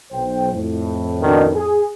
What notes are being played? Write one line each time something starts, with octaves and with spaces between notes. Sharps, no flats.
B1 C5 G5
F2 A2
B2 D#3 D4
G#4